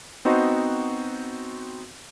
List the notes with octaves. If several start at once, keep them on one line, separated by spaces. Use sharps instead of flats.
B3 C4 D#4 F#4 C5 D#5